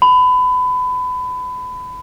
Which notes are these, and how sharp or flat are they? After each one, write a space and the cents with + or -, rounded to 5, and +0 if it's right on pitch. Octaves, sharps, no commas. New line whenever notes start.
B5 +25